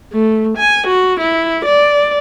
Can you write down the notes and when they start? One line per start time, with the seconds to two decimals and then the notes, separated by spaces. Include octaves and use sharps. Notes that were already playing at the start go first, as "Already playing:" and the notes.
0.13 A3
0.58 G#5
0.87 F#4
1.20 E4
1.66 D5